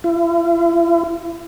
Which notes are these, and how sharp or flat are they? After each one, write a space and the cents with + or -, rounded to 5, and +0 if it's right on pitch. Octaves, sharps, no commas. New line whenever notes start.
E4 +45